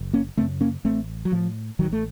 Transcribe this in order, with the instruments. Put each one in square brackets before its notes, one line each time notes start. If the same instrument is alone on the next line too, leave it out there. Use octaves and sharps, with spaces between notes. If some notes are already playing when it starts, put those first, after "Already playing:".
Already playing: [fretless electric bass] F#1
A#3 C#4
F#2 C#3 A3 C4
A#3 C#4
A1 A3 C4
F#3
A2 F3
A1 D#3 F#3
A3